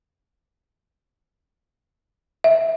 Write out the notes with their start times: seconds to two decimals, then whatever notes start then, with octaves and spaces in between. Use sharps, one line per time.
2.44 E5